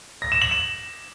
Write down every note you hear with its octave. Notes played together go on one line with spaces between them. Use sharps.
A#6
E7
F#7
E7